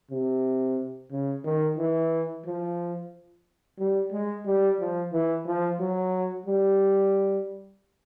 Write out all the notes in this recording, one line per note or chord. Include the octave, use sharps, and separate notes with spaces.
C3
C#3
D#3
E3
F3
G3
G#3
G3
F3
E3
F3
F#3
G3